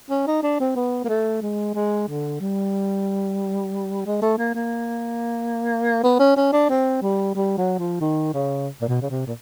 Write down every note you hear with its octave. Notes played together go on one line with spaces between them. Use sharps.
C#4
D#4
D4
C4
B3
A#3
A3
G#3
G#3
D3
G3
G#3
A3
A#3
A#3
B3
C#4
C#4
D4
C4
G3
G3
F#3
F3
D#3
C#3
A#2
B2
C#3
C3
A#2